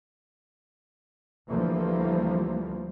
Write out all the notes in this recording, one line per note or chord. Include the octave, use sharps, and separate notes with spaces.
D2 E3 F3 G3 A3 A#3